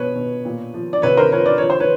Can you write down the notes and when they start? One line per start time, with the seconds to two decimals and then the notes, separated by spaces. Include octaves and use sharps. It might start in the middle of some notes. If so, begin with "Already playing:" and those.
Already playing: B2 F3 B4 C#5
0.16 B2
0.45 A#2
0.74 F3
0.93 D5
1.02 C3 B4 C#5
1.17 A#4 C5
1.32 F3 B4 C#5
1.46 D5
1.58 F3 C#5
1.70 C5
1.80 B4 C#5